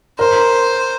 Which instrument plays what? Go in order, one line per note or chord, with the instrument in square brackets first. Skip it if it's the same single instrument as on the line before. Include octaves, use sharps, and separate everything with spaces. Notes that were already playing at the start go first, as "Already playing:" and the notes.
[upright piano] A#4 [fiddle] C5